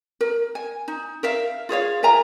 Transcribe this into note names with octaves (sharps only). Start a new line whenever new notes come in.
A#4
G#5
D#4
A#4 E5 F5
F4 G#4 C#5 F5
A#4 E5 G#5 A#5